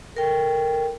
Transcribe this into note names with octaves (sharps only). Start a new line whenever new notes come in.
A4 A#4 G5